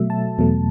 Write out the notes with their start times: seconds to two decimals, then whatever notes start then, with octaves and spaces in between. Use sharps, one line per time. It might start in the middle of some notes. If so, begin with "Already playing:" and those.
Already playing: B2 F#3 A3 E5
0.10 A5
0.38 E2 B2 F#3 A3